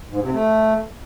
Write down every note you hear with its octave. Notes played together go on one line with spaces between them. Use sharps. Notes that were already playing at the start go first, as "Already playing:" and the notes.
G#2
C3
A3